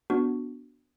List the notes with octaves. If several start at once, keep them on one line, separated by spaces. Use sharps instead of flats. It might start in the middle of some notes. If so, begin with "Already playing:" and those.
B3 D4 F#4